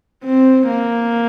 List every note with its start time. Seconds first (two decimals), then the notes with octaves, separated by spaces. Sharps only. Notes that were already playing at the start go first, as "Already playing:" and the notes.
0.25 C4
0.67 A#3